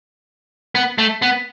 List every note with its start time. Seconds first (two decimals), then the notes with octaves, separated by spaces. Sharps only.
0.75 B3
0.98 A3
1.22 B3